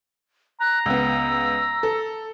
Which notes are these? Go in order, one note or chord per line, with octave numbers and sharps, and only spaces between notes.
A#5 F#6
C#2 B3 E6
A4